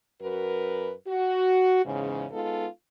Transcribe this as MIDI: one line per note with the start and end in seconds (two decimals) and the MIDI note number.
0.22 0.92 42
0.22 0.92 66
0.22 0.92 70
0.22 0.92 71
1.08 1.82 66
1.85 2.26 40
1.85 2.26 44
1.85 2.26 49
2.32 2.67 56
2.32 2.67 59
2.32 2.67 63
2.32 2.67 65
2.32 2.67 69